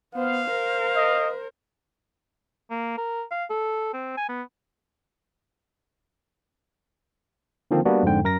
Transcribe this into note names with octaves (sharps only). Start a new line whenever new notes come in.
B3 C5 F5
A#4 C5
D#5
A#3
A#4
F5
A4
C4
G#5
B3
D3 D#3 F3 A#3 C4
G3 A#3 B3 D4 F#4
F2 G#2 D3 G5
F#2 A#4 A#6